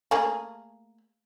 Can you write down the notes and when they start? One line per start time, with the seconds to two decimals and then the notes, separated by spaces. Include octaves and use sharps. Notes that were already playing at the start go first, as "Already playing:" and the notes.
0.11 A3 A#3 G#4